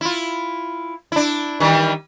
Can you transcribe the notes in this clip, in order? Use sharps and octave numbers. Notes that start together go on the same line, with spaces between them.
E4 F4
D4 E4
D#3 E3 G3